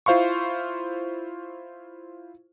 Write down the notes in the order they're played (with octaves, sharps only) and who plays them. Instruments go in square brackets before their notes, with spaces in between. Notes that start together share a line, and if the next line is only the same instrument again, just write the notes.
[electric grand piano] E4 F4 C5 F5 C6 C#6